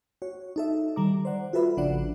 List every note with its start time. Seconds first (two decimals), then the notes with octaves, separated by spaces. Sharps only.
0.22 F#4 C#5
0.56 D#4 A4 E5
0.96 D#3 G3 A#5 D6
1.25 C5 D5 F#5
1.53 F4 F#4 A4 B4 E5 B5
1.77 A1 C#3 F3 D4 D5 F#5